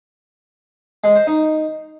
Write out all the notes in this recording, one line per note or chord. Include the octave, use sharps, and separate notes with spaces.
G#3
C5
D#4